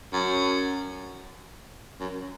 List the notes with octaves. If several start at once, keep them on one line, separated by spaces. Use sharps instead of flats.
F#2
F#2